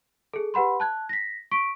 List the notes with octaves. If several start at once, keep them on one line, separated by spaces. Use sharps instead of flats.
G#4 A4
G4 B4 F#5 B5 C6
A5 F#6 G#6
A#6 B6
C#6 B6 D7